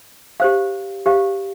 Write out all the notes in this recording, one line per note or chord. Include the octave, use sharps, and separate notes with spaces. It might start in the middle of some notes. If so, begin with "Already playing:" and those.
G4 C5 F5
G4 C5 F5